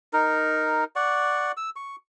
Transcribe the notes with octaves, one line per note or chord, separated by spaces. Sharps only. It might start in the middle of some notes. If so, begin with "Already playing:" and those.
D#4 A#4
D5 F#5 C#6
E6
C#6